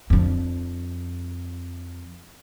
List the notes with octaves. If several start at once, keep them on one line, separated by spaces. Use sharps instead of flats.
F2 D4